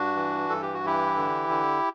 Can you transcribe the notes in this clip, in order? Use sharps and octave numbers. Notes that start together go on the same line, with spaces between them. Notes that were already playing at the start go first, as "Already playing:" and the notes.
Already playing: G2 D4 F#4
E3
G2 A4
G4
F#4
E3 E4 G4
D3
D3